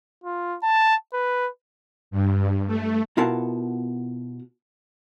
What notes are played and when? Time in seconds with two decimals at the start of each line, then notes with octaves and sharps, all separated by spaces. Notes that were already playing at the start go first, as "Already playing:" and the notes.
0.24 F4
0.63 A5
1.14 B4
2.11 G2
2.67 A3
3.17 B2 E4 F4 A#4 F#5 A5